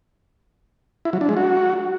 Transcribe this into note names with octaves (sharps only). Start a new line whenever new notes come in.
E4
F#3
D4
G#3
F#4